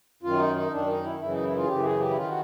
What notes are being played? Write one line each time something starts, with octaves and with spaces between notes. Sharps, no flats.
F#2 D#3 F4
D#4
D#4
F#2 D#3 D4
D#4
E4
F#2 C#3 E3 E4
D#4
E4
F4
G#4
F#2 C#3 E3 G4
G#4
G4
E4
D#3 F4
F#4